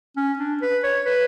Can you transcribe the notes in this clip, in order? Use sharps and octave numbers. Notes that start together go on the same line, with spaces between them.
C#4
D4
B4
C#5
B4